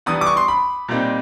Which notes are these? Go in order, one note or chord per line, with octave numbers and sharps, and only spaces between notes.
E3 G3 B3 D4 D#6
D6
C#6
C6
B5
A#2 G3 C4 D#4